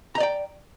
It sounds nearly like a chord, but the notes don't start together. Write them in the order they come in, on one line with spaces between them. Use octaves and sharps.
A#5 D#5 D5 G5